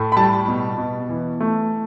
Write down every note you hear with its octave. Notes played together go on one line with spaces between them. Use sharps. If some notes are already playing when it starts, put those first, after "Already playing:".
Already playing: A2 A3
B5
G3 A5
B2
B2
E3
A3